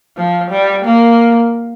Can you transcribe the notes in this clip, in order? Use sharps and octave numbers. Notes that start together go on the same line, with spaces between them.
F3
G3
A#3